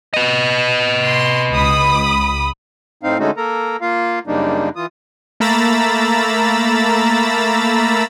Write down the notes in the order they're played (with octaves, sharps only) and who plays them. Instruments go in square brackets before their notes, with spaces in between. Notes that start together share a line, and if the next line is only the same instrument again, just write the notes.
[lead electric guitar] B4 D#5
[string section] C6
C#2 B5 D#6
[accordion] A2 C4 D#4 F5
D3 G#3 A3 C#4 D#4 F#4
A#3 A4 A#4 A#5
A#3 F4 F5
F#2 C#3 G3 A#3 D4 D#4
E3 F4 D#6
[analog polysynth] A3 A#3 A#5 B5 E6 A6